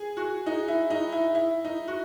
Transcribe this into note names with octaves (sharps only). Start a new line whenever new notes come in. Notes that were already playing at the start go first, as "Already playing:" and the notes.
Already playing: G#4
F#4
D#4
E4
D#4
E4
E4
D#4
F#4